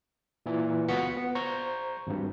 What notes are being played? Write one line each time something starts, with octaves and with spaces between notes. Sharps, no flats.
A#2 E3
C#2 B3 F4 F#4 B6 C#7
B3
C5 A#5 C#6 G6
G#1 G2